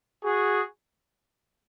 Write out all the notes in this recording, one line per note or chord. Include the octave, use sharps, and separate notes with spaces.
F#4 G#4